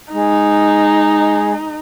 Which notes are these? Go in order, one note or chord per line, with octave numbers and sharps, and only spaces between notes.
G#3 D#4